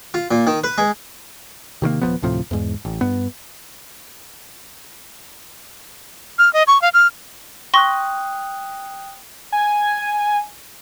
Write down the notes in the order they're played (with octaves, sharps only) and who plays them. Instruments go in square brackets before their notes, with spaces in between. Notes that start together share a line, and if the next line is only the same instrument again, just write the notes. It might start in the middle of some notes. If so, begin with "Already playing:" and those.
[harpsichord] F4
A#2
D#3
B4
G#3
[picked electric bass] C3 D#3 F3 A#3
D#1 D2 F3 B3
D2 A2 C3 F3
E2 G#2
A1
G2 B3
[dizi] F6
D#5
C#6
F5
F6
[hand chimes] G5 D#6 F#6 [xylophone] C6 C#6 A#6
[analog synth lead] G#5